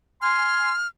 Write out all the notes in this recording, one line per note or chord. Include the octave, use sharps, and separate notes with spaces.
G#5 C6 F6